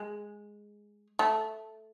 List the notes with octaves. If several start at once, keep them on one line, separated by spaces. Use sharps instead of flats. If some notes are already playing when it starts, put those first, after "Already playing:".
Already playing: G#3
A3